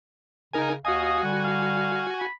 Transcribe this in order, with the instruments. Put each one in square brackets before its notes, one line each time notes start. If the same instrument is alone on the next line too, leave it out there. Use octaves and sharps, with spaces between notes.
[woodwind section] C#3 [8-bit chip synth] D#4 A#4 G#5
[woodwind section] D#2 F5 D#6 [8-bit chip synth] F#4 G#5 [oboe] D#5
[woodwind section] D3 G3 [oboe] F#5
[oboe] F5
B5